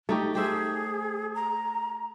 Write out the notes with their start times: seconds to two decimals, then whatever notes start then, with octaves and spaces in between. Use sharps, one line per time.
0.09 A3 D#4 G4
0.35 G4 G#4 C5 E5
1.35 A#5